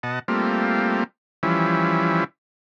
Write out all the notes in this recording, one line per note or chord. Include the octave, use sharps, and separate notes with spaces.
B2 D#5 F#5 A5
G3 A3 A#3 C4 F4
E3 F3 G3 C#4 E4